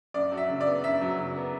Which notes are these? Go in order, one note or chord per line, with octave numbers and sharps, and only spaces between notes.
F#2 D5
F#3
E5
C#3
D5
B3
F#2 E5
F#3
C#3
B3